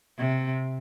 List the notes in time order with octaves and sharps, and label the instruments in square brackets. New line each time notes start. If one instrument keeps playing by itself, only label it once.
[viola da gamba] C3